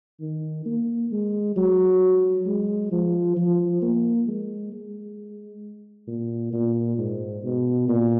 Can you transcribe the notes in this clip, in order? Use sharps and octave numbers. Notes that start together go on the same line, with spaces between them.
D#3
A#3
G#3
F#3
G#3
F3
F3
A#3
G#3
G#3
A#2
A#2
G#2
B2
A#2